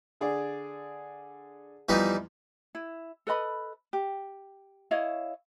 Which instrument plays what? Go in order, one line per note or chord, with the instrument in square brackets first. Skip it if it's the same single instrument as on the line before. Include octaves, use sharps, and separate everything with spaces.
[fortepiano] D3 G#4 D5
[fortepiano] E2 F3 D5 [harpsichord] E3 G3 D#4
[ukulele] E4
A4 B4 D#5 B5
G4
E4 C#5 D#5 F5